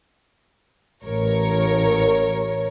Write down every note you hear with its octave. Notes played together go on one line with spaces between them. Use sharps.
A1 A#4 C#5